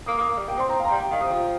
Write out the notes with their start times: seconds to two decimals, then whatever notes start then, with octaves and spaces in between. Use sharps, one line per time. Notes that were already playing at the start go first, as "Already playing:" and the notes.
0.06 A#3 D#6
0.18 A#3
0.21 D#6
0.28 A#3
0.38 G3
0.48 A#3 G5
0.58 C4 C6
0.69 C4 A#5
0.80 F5
0.85 A#5
0.89 G3 G5
1.00 G5
1.11 D#3 F5
1.21 C3 D#6
1.32 F3